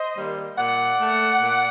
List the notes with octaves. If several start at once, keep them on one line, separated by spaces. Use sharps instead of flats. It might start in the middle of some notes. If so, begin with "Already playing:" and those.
Already playing: C5 D#5
D#3 G3 A#3
A#2 D5 F#5
A3
A#2